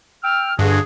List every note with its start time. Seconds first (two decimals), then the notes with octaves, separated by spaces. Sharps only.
0.23 G5 E6 F6
0.59 G2 D3 F#4 G#4